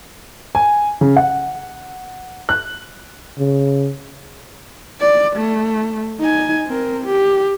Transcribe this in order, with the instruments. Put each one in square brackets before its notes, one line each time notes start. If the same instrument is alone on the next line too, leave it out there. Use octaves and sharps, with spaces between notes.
[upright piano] G#5
C#3
F#5
F#6
[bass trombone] C#3
[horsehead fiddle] D5
A3
D#4 G#5
C4 A#4
G4